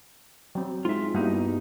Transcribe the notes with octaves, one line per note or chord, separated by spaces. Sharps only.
F#3 C4
G#2 F4 E5
G2 B2 G3 A#3 D#4 E4